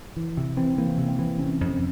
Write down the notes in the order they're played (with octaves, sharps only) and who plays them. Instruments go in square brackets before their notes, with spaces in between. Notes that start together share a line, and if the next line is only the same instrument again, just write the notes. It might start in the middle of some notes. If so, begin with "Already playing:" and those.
[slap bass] E3
C3
[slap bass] E3 [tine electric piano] C4
[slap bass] E3 [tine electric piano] A#3
[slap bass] C3
[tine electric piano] C4
[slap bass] E3
[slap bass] C3 [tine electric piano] C#4
[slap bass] F2
[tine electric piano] C4